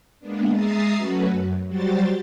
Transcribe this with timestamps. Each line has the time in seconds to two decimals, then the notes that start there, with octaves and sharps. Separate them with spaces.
0.20 G#3 A#3 B3 D4
0.51 G#3 E5 A#5 D#6 A6 C7
0.97 F#3 A3 C#4 F#4 B4
1.29 F#2
1.67 F#3 G3 F#4 G4 C5 A6